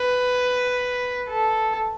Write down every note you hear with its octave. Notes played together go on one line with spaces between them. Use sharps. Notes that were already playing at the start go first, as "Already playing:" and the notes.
Already playing: B4
A4